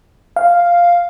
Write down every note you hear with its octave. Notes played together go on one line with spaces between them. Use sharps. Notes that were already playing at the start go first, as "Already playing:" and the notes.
F5